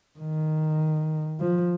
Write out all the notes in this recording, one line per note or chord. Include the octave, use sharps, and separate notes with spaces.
D#3
F3